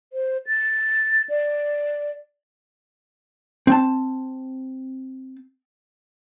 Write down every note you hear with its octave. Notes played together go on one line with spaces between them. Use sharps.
C5
A6
D5
C4 A5